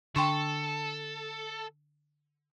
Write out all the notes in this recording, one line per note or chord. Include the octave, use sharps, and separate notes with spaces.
D3 A4 G5 C6 C#6